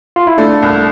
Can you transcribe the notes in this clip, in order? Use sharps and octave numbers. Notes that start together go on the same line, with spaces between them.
F4
E4
A3 D4
C2